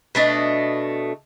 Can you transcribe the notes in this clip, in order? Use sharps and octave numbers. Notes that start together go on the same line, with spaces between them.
B2 A3 D4 D#5